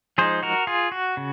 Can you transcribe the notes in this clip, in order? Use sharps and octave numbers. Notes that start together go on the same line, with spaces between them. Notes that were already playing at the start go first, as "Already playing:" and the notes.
F3 G#3 D#4 G#4 C5
F#4 A#4
F4 G#4
F#4
C#3